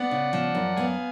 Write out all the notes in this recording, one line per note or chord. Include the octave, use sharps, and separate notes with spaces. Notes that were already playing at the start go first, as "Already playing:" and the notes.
Already playing: B3 D5 F#5
C#3
F3
F#2
B3 F5 G#5